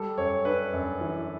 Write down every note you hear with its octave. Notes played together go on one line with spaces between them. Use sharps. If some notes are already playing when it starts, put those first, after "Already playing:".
Already playing: G3 A4
F#2 C#5
D4 B4
F#2
E3